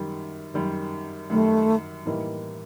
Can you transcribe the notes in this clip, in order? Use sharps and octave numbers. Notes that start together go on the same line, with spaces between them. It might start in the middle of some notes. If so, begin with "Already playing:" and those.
Already playing: F#2 D#3 G3
F#2 D#3 G3
F#2 D#3 G3 A3
A2 E3 G3 A#3 D#4